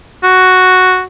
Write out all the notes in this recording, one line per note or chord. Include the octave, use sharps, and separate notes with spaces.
F#4